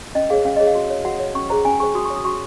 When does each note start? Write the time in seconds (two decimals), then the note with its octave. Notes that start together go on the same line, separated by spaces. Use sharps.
0.15 C#4 D#5
0.30 G#4 C#5 F5
0.45 C#4 F5
0.56 G#4 C#5 D#5
0.67 F5
0.75 F#4
0.90 C#5
1.05 F#4 F#5
1.20 C#5
1.35 C#4 C#6
1.50 G#4 C5 A#5
1.65 C#4 G#5
1.80 G#4 C5 C#6
1.95 F#4 D#6
2.05 C#6
2.10 C#5 D#6
2.25 F#4 C#6